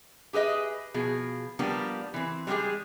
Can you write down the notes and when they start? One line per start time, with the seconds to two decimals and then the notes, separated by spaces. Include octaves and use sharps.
0.33 G4 G#4 B4 D#5 E5
0.94 B2 F3 G#4
1.59 F3 G3 A#3 B3 D4
2.14 E3 C4
2.47 G3 G#3 C#4 G4 G#4